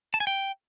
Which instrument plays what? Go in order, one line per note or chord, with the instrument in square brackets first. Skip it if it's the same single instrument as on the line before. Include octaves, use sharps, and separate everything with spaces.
[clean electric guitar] A5
G#5
G5